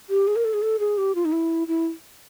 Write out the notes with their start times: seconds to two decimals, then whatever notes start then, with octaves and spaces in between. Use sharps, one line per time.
0.10 G4
0.27 G#4
0.36 A#4
0.45 A4
0.53 G#4
0.62 A4
0.79 G#4
0.98 G4
1.15 F4
1.25 D#4
1.32 E4
1.68 E4